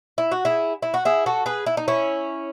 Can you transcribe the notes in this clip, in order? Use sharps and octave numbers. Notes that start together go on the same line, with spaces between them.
E4
F#4
E4 G#4
E4
F#4
E4 G#4
F#4 A4
G#4 B4
E4
D#4
C#4 E4